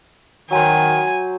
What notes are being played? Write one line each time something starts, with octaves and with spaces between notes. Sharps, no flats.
D#3 F#3 C5 G#5